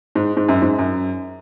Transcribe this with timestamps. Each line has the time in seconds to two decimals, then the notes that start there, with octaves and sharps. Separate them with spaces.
0.15 G#2
0.37 G#2
0.48 F#2
0.62 G#2
0.79 F#2